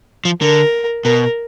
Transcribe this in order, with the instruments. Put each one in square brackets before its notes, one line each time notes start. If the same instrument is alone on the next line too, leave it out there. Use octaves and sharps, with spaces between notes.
[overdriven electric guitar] F3
[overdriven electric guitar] D3 [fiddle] A#4
[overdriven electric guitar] B2 [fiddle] A#4